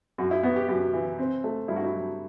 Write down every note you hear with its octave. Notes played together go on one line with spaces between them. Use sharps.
F#2 F#4
E4
B3 F#4
G4
F#2 F#4
E3
C4
A3
G2 E4
F#4
E4
F#3